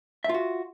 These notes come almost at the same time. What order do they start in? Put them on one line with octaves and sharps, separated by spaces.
E5 F4 F#4